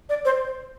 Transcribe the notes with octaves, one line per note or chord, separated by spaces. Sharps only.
D5
C5